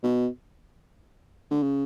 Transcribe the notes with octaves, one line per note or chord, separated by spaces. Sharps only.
B2
D3
C#3